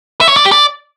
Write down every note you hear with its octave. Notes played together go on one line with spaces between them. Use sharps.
E5
C#5
D5
G4
D5